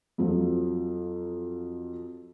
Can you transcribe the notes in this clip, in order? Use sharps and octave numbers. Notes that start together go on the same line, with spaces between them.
F2 F3 F#3